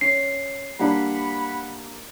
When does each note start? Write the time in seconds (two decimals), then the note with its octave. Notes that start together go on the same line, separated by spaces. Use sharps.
0.01 C#4 C7
0.79 G3 A#3 D4 F#5 B5